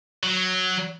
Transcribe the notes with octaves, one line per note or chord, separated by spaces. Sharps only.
F#3